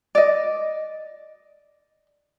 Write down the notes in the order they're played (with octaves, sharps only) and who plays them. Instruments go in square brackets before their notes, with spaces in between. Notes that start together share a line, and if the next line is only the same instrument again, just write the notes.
[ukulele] D5 D#5